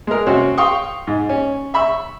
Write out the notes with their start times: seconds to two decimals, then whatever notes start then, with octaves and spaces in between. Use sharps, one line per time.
0.07 G#3 A#4
0.26 C3 C4 C#4 F#4
0.58 F5 G5 C6 C#6 D#6
1.07 G#2
1.29 C#4
1.74 E5 B5 C#6 E6